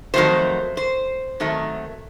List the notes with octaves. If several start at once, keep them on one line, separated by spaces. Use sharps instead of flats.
F2 D#3 F#3 A3 C5
C5
C3 D#3 F#3 A3